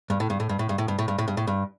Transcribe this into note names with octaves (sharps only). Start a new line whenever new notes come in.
G2
A2
G2
A2
G2
A2
G2
A2
G2
A2
G2
A2
G2
A2
G2